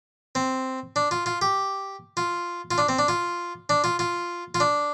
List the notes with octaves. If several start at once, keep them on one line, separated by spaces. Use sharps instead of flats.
C4
D4
F4
F4
G4
F4
F4
D4
C4
D4
F4
D4
F4
F4
F4
D4